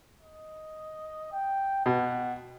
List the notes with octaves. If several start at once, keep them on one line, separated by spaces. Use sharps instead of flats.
D#5
G5
B2 F#5